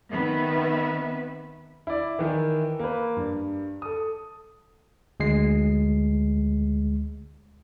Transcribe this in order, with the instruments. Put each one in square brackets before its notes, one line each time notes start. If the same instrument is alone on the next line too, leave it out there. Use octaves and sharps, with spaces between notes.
[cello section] D#3 B3 C4 B4 E5
[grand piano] E4 D5
D#3 E3
A#3 B4
G2
A4 D#6
[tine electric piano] D2 G#3 C7